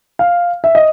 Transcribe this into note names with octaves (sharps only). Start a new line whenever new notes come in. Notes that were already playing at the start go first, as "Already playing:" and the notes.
F5
E5
D#5